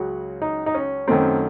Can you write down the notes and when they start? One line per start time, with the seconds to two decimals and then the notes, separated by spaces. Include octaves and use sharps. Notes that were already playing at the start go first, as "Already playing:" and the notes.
Already playing: C#2 C#3 F#3 F#4
0.42 D#4
0.66 D#4
0.74 C#4
1.08 F#2 D#3 A3 C4